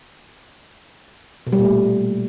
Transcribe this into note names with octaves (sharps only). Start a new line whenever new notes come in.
B2
G3
A#2
A3